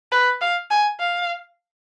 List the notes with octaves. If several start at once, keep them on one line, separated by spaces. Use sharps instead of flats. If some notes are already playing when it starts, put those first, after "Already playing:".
B4
F5
G#5
F5